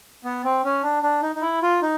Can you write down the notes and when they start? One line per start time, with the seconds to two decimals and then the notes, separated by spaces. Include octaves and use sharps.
0.24 B3
0.44 C4
0.64 C#4
0.83 D4
1.03 D4
1.22 D#4
1.35 D#4
1.42 E4
1.62 F4
1.82 D#4